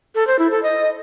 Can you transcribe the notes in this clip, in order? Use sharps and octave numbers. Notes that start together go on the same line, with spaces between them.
A4
C5
E4
A4
D#5